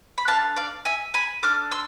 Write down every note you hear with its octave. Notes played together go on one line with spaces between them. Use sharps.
B5
D4 A4 F5 A5
D5 F5
E5 G#5
G#5 B5
D4 A4 D6 F6
C6 E6